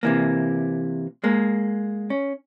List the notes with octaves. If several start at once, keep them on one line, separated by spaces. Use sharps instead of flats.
C3 E3 A#3
G#3 A#3
C#4